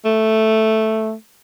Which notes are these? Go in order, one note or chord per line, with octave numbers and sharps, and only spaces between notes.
A3